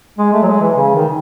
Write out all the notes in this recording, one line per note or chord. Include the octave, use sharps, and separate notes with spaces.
G#3
A3
F#3
G#3
E3
C#3
D#3